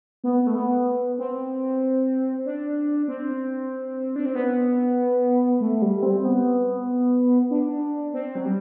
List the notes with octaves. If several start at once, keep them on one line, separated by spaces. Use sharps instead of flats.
B3
A3
B3
C4
D4
C4
D4
C4
B3
A3
G3
C4
B3
D4
C4
F#3
G3